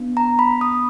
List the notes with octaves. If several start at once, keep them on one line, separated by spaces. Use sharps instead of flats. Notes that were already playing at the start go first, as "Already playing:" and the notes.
Already playing: B3 D4
A#5
B5
D#6